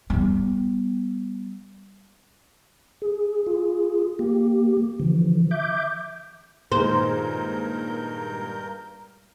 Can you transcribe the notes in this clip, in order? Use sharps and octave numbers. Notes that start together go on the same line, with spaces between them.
G3 B3
G#4
F4 G#4
A#3 G4
D3 E3 F3
E5 D6 G6
G2 A#2 D#3 G#3 A#4 C5 G6